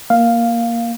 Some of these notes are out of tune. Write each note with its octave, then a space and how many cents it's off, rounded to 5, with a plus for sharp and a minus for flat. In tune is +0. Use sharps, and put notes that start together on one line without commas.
A#3 +5 F5 +0